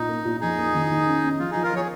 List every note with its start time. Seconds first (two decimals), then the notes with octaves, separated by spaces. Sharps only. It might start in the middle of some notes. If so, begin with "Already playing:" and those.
Already playing: A#2 D#4
0.09 A#3
0.25 A#2
0.41 F2 D#4 G#4
0.58 A#3
0.75 D#3
0.91 D#3
1.07 C#4
1.24 C#4
1.39 F3 F4
1.51 F3 D#4 G#4
1.63 F4 A#4
1.73 F3 G#4 C#5